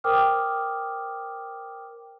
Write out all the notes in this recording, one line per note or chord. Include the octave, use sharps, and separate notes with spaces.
A#4 C5 G5 D6 D#6 F6